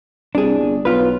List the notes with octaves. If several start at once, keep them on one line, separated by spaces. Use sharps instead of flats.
C2 D4 G#4
G1
B1 F4 B4